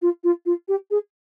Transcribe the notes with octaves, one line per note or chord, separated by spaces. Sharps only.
F4
F4
F4
G4
G#4